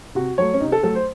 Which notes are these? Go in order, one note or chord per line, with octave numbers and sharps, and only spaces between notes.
C3 F#4
F#3 A3 C#5
C#4
C3 D#4
A4
F#3 A3 A4
C5